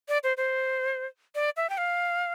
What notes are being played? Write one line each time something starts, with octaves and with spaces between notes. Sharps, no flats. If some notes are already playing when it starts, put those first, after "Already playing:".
D5
C5
C5
D5
E5
G5
F5